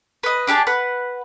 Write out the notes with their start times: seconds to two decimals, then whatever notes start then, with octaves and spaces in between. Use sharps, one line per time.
0.23 B4 D#5
0.47 D4 G4 G#4 A5
0.67 B4 F#5